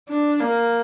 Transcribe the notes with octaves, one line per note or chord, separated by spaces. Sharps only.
D4
A#3